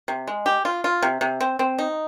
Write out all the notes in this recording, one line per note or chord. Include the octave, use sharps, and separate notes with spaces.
C3
G#3
G4
F4
F4
C3
C3
C4
C4
D#4